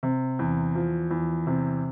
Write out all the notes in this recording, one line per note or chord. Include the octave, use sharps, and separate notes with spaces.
C3
E2
F3
E2
C3